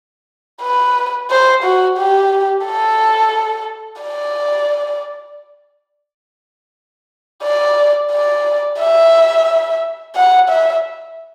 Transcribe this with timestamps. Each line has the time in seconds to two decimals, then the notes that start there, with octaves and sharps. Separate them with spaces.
0.62 B4
1.30 C5
1.64 F#4
1.98 G4
2.66 A4
4.02 D5
7.43 D5
8.11 D5
8.79 E5
10.15 F#5
10.49 E5